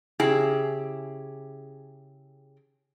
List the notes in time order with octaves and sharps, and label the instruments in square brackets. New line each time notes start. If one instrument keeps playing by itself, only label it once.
[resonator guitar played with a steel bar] C#3 E4 G4 G#4